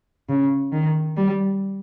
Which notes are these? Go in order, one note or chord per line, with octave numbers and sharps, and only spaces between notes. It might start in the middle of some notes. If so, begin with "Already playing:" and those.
C#3
D#3
G3